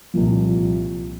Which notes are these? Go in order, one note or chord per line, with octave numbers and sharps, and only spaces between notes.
C2 A#2 F3